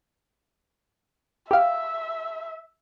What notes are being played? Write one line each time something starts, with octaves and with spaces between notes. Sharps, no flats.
G4 E5 F5